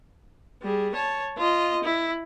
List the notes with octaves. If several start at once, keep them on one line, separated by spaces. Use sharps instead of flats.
G3 G#4
C#5 A5
F4 D#5
E4